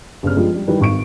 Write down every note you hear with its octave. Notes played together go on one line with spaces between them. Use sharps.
G1 C#3 F6
G2 F3 G3 G#3
G3
D#3 E3 G3 G4 B4
G#1 C#6 D7